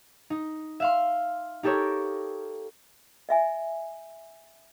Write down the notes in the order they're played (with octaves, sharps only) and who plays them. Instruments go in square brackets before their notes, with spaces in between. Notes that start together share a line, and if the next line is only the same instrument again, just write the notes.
[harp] D#4
E5 F5 C6
D#4 G4 A4 A#4 C#5
[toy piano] D#5 E5 G#5